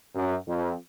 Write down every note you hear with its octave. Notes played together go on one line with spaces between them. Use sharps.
F#2
F2